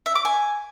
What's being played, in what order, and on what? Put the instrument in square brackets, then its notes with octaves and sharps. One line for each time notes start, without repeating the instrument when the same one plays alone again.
[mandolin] E5
D6
G#5